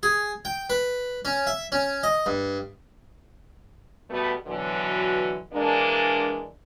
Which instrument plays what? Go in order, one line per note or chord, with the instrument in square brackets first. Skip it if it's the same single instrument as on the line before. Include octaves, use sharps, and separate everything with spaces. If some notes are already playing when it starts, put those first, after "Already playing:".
[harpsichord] G#4
G5
B4
C#4
E5
C#4
D#5
G2
[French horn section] B2 G3 A3 B3
B2 D3 E3 F#3
E3 G#3 A#3 D4